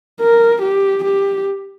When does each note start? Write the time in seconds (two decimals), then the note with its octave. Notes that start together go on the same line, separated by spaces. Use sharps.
0.20 A#4
0.62 G4
1.04 G4